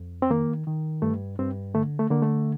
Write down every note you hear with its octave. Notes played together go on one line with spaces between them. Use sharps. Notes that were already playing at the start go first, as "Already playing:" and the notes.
Already playing: F2
C4
D#3 A#3
D#3
G2 A3
G2 C4
D3 A3
A3
D3 A#3
A3